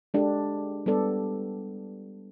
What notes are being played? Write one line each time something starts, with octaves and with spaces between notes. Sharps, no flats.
G#3 D4 G4 A4
G3 B3 D4 A4 D5